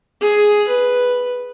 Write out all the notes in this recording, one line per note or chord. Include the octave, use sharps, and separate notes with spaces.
G#4
B4